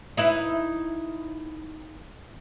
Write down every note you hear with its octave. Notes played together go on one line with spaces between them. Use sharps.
D#4 E4 B4